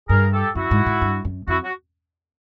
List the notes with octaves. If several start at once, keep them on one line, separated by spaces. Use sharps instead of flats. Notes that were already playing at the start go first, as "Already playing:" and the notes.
G2 G#4 A#4
G4 A4
F#2 E4 F#4
G#2
G#2
G2
F#2
F2 E4 F#4
F#4